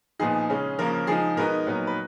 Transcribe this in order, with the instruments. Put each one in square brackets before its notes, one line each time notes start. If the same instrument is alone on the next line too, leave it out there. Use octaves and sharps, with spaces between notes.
[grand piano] A#2 F3 B3 D#4 G#4
C#3 G#3 C#4
C#3 F3 A#3 C#4 A#4
F3 G#3 D#4 G#4
B2 G#3 B3 D#4 A#4
A#2 F#3 B3 D#4
B4